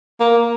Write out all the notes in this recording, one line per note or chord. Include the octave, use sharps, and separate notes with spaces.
A#3